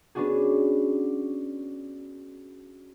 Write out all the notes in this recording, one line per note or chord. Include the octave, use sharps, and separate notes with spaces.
B3 C#4 D4 F#4 G#4